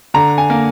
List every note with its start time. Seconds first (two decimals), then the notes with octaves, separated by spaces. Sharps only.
0.14 D3 A#5
0.38 G#5
0.50 A#3